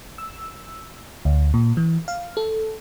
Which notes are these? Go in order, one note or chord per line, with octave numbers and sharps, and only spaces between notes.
E6
D2
A#2
E3
F5
A4